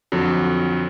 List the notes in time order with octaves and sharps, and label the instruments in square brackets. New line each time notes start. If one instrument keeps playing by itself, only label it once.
[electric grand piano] F2 D3 F#3